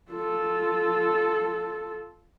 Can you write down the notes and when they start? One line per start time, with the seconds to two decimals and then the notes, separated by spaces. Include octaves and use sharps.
0.11 F4 A4